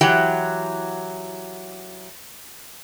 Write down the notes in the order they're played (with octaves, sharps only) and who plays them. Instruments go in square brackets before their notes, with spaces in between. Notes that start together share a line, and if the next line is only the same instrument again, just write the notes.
[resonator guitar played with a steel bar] E3 F#3 G4 F#5 G5